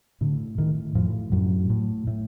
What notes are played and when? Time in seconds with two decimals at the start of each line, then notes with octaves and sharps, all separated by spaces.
0.21 A2 D3
0.58 A2 D#3
0.95 F2 A2 F3
1.32 F#2 A2 F#3
1.70 A2
2.07 A2